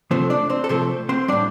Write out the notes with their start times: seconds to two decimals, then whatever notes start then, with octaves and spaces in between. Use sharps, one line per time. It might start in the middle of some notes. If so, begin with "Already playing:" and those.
0.11 C3 F3 A3 C4 C5
0.30 D4 D5
0.50 C4 C5
0.64 A4
0.69 C3 F3 A3 C4 C5
1.09 C4 C5
1.28 A2 G3 D4 D5